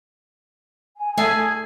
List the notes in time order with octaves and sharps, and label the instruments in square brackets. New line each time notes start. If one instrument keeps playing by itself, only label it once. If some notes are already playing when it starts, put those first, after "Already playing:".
[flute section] G#5
[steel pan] A3 E5 A5 [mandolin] G#4 G#5 [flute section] G#6